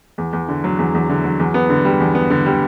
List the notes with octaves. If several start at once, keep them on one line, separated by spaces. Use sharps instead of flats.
E2
E2
D3
F#3
E2
E2
D3
F#3
E2
B3
D3
G3
E2
B3
D3
G3